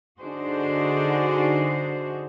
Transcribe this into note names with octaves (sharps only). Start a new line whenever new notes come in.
D3 D4 D#4 F#4 G#4 C5